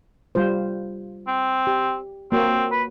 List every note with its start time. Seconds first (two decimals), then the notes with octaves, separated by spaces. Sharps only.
0.35 G3 F4 C5
1.27 C4
1.67 G4
2.32 A#3 C4 F#4 C#5
2.72 B4